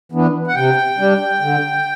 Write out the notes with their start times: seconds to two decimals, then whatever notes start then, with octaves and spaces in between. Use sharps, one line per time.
0.12 E3 B3 D4
0.47 F#5
0.55 C3 G5
0.99 G3 D4
1.41 D3